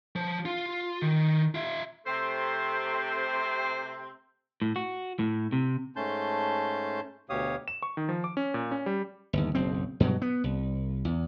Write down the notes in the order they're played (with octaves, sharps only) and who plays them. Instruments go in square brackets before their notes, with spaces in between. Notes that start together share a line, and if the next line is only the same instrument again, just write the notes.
[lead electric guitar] F3
F4
D#3
F4 E5
[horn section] C3 A3 C4 [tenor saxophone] C5
[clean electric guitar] A2
F#4
A2
C3
[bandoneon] G#2 A3 C#4 A5 C6 G6
D2 B2 G4 C#5 F5 D#6
[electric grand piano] E7
C#6
D#3
F3
D6
C#4
A#2
C#4
G3
[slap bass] G1 D#2
F#1 B1 C4
G2 B2 F#3
B3
C2
E2